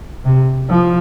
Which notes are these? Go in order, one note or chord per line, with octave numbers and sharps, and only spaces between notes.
C3
F3